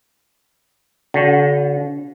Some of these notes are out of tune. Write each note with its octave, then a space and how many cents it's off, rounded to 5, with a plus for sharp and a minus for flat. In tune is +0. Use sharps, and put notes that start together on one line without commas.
D3 -45 F#4 +0